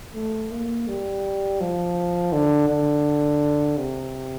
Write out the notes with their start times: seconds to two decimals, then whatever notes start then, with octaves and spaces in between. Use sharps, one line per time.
0.15 A3
0.51 A#3
0.88 G3
1.61 F3
2.33 D3
2.68 D3
3.78 C3